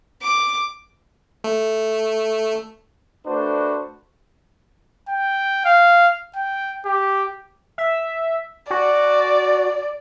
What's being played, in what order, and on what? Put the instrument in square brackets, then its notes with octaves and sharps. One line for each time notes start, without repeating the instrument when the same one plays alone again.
[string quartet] D6
[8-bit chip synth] A3
[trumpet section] A3 D4 F#4 B4 C5
[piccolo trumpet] G5
F5
G5
G4
[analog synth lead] E5
[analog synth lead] F#4 [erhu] D5